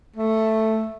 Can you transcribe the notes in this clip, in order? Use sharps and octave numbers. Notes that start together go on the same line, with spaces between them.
A3